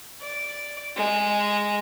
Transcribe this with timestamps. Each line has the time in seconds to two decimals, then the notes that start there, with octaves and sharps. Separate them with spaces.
0.21 D5
0.96 G#3